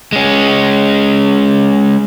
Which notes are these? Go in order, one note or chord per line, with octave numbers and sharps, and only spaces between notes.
G#3 C#4